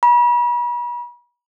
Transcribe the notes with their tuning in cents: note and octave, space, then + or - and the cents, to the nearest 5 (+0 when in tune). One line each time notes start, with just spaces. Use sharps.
B5 -40